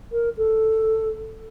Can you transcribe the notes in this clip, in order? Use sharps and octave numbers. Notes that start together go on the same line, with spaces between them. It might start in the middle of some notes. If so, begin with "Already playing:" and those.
A#4
A4